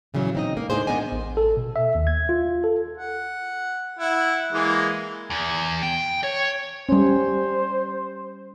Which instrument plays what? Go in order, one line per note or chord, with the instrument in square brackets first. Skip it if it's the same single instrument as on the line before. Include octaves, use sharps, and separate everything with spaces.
[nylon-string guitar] A#2 C#3 E3 F#3 B3
C4 D#4 D#5
A#3
A2 D4 D#4 G#4 C5
B3 D4 A#4 D#5 G#5
[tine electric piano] A1
A4
B2
E5
D#2
G#6
F4
A4
[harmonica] F#5
E4 F#5
E3 G#3 A#3
[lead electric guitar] E2
G5
C#5
[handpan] G3 C#4 [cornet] C5